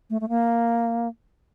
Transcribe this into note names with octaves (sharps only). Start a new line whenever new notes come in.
A3
A3
A#3